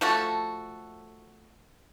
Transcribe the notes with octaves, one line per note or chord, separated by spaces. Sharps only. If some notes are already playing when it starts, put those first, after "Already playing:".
F3 A3 F#4 A4